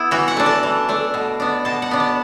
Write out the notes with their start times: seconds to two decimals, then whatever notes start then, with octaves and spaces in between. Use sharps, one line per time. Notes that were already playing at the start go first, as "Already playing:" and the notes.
Already playing: B3 E4
0.11 E3 F#4
0.28 F#5
0.37 A3 D4
0.46 A5
0.63 E3
0.89 A3 D4
1.14 B2
1.40 B3 D4
1.65 B2 A5
1.82 F#5
1.91 B3 D4
2.00 A5